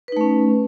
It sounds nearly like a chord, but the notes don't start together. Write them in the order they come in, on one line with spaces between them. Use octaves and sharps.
B4 D#4 A3 C#4